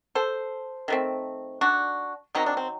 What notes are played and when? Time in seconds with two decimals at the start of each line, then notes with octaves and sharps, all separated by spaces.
0.15 A4 C5
0.88 D#3 A3 C4
1.61 D4 F#4
2.35 D#3 F#3 C4 D#4
2.46 D4
2.57 C4